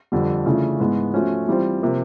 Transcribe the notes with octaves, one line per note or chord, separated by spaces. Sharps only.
F2 D3 G3
C#3 E3 A3 D4 F4
G#2 E3 G#3 B3
F3 A3 C#4 F#4
E3 G3 C4 F4
C3 F3 A#3